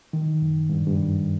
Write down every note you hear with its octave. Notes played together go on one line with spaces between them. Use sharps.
D#3
F#2
G2
G2
F#2